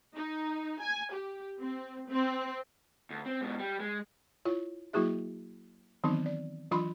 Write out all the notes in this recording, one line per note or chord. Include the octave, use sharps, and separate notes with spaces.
D#4
G#5
G4
C4
C4
D2
C4
G#2 B2
G3
G#3
E4 F4 C#5
F#3 A#3 E4 F#4 G#4 E5
D#3 E3 F#3 B3 C4 D#4
D5
E3 F#3 D4 F4 B5 C6